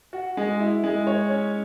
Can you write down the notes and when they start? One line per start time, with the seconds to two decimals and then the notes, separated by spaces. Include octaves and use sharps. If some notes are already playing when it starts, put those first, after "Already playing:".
0.13 F#4
0.37 G#3
0.60 E4
0.84 G#3
1.07 C#5
1.31 C#4